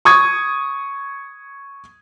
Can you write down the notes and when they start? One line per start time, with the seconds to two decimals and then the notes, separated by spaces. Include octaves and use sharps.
0.05 C#6 D#6 G#6